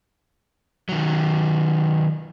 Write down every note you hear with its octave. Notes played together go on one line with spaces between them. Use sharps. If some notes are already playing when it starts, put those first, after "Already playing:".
D#3 F#3